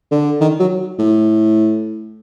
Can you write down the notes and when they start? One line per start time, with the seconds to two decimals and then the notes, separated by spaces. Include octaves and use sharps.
0.11 D3
0.41 D#3
0.60 F#3
0.99 A2